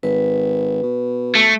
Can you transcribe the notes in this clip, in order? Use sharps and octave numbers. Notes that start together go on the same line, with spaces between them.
G#1 B4
B2
A3